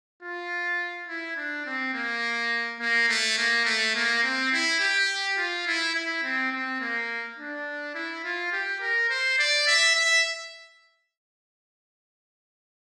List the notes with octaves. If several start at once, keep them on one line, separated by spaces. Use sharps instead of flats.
F4
E4
D4
C4
A#3
A#3
A3
A#3
A3
A#3
C4
E4
G4
F4
E4
E4
C4
C4
A#3
D4
E4
F4
G4
A#4
C5
D5
E5
E5